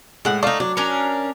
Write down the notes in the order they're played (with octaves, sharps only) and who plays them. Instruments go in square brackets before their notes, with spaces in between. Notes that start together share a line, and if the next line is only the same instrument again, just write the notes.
[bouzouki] A2 F#5 [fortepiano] G#3
[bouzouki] A3 D#4 [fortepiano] D5 F5
[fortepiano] F#3 [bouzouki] D4
[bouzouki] C#4 D4 A#4